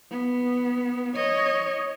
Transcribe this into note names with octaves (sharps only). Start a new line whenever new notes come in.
B3
C#5 D#5